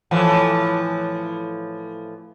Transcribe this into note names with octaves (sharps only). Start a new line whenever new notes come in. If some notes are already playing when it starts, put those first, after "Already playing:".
A2 E3 F3